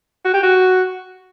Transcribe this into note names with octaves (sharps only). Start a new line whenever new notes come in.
F#4
G4
F#4